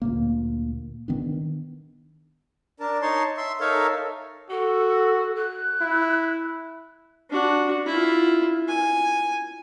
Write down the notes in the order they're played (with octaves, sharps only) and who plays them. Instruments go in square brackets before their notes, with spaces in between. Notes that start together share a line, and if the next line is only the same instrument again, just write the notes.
[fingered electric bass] D2 A#2 A#3
D#3 B3 D4
[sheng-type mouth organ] D4 A#4 A5
D#4 C#5 A5 C6
E5 C6
D#4 A4 A#4 C#5 E5 F5
[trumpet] F#4 [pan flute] A4
[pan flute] F#6
[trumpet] E4
[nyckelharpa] D4 F#4
E4 F4
G#5